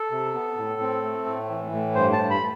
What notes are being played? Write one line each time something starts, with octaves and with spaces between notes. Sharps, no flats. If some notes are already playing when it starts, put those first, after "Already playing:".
Already playing: A4
C3
B3
A2
C4
A3
A2
E3
A2
G2 C5
A5
G2
B5